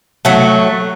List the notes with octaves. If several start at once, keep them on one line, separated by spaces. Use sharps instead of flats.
F#3 A3